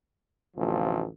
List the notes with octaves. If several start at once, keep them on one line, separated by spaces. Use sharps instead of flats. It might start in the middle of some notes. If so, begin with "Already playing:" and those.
A1 D2 C3 F3 F4